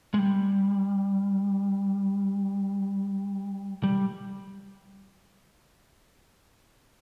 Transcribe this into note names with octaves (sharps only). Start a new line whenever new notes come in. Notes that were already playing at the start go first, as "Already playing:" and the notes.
G#3
G3
G3